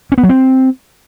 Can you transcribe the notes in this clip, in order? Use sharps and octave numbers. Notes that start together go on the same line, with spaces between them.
C#4
B3
F#3
C4